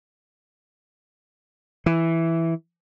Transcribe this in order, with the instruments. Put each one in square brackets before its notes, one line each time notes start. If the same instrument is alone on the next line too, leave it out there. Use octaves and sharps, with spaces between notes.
[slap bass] E3